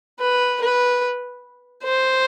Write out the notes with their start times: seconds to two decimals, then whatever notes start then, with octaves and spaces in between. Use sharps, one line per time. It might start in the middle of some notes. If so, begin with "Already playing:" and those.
0.20 B4
0.61 B4
1.83 C5